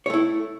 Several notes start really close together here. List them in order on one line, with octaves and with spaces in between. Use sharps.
C#5 A3 E4